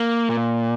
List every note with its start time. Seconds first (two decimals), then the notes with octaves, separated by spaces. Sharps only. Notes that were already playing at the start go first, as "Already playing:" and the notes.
Already playing: A#3
0.29 A#2